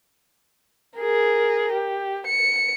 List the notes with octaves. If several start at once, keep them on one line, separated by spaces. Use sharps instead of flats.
G#4 A#4
G4
C#7